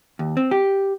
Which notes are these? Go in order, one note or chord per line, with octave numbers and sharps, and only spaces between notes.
D#2
C4
G4